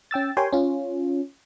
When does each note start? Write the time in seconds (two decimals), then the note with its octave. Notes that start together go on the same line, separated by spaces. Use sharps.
0.11 C#4 G5 E6 A6
0.37 G4 A#4 C#5 G5 G#5 C6
0.53 C#4 F4